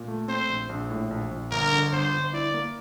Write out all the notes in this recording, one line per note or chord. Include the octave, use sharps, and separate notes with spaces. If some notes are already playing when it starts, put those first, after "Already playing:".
Already playing: A#2
A3
C4 C5
A#1
A#1
A2
A#1
A#1
G1 A#4
D3
G1 C5
G1
E4 D5
A#3